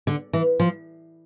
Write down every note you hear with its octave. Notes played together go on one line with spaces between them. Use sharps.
D3
E3
F3